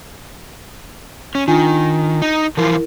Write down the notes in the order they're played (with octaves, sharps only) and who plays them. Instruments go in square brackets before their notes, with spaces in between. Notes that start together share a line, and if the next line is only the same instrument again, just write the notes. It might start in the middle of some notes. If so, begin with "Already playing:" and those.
[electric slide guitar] C#4
[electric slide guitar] D#3 [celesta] D4 F4 G#5
[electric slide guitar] D#4
[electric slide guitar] E3 F3 F4 [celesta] E4 A#4